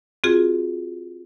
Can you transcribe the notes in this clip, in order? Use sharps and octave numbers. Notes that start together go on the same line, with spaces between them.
C4 F4 F#4 G#4